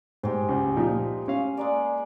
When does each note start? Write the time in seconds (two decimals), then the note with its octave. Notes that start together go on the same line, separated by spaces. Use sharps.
0.23 G#2 G#3 G4
0.49 C#2
0.77 A#2 F3 D#4
1.28 C#4 F5
1.57 G#3 A#3 D5